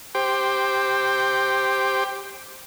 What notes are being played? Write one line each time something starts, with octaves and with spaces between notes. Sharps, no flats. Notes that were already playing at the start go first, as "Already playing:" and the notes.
G4 C5 G5